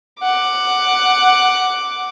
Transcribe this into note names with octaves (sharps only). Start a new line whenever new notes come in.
F#5 D6